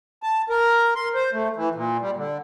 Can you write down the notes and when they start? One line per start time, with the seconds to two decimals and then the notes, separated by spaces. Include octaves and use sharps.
0.23 A5
0.49 A#4
0.96 C6
1.15 C5
1.33 A3
1.56 E3
1.75 A#2
2.01 G3
2.17 D3